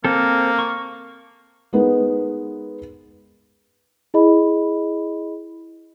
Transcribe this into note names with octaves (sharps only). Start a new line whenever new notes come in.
A#3 C4 A4
C#6
G#3 B3 D#4 A#4 B4
E4 G#4 D#5 B5